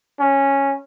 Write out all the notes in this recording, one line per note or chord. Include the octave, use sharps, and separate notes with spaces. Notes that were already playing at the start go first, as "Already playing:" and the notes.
C#4